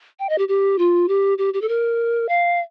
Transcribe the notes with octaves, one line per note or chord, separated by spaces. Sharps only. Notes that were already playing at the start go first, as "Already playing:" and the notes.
G5
D#5
G4
G4
F4
G4
G4
G4
A4
A#4
F5